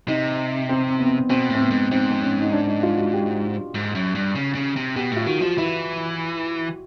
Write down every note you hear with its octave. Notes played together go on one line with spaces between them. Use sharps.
C3 D#4
C4
B3
B2 C4
A2 C4
B3
G#2
G#2 C4
C4
C#4
D#4
D4
D#4
F4
F#4
G4
G#2
F#2
G2
C#3
C#3
C3
B2 G4
A2 F4
D#3 F#4
F3 F4
E3 E4